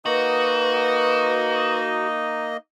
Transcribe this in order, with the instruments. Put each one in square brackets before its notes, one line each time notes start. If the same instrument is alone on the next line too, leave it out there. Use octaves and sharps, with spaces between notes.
[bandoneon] A#3 D#5 [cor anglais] D#4 [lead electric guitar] F#4 [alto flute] B4